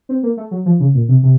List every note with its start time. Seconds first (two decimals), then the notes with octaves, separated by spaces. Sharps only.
0.09 C4
0.23 A#3
0.37 A3
0.51 F#3
0.66 F3
0.80 C#3
0.94 A#2
1.09 C3
1.23 C3